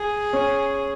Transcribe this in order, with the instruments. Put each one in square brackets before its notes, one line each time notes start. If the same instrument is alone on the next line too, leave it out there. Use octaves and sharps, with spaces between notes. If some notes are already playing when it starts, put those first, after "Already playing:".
Already playing: [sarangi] G#4
[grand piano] C#4